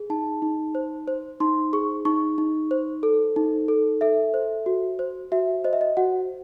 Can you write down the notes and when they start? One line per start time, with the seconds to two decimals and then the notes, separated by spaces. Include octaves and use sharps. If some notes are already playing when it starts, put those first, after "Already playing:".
Already playing: G#4
0.10 D#4 A5
0.42 D#4
0.75 C5
1.08 C5
1.40 D#4 C6
1.73 G#4 C#6
2.05 D#4 C#6
2.38 D#4
2.71 C5
3.03 A4
3.36 D#4
3.68 A4
4.01 A4 E5
4.34 C5
4.66 F#4
4.99 C5
5.32 F#4 E5
5.64 C5 D#5
5.73 E5
5.81 D#5
5.97 F#4 F#5